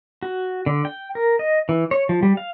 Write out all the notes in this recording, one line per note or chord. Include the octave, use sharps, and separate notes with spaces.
F#4
D3
G5
A#4
D#5
E3
C#5
F3
G3
F5